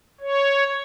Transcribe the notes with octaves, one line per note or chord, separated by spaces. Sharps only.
C#5